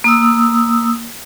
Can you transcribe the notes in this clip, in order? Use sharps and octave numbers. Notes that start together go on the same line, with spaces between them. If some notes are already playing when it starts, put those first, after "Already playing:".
A#3 D#6 E6